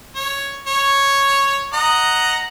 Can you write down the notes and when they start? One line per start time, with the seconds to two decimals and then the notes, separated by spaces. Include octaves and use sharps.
0.16 C#5
0.67 C#5
1.73 D#5 F#5 A#5